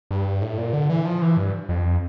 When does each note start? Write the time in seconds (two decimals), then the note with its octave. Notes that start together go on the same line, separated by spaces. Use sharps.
0.11 G2
0.42 A2
0.58 A#2
0.73 D3
0.89 E3
1.05 F3
1.22 E3
1.37 G2
1.69 F2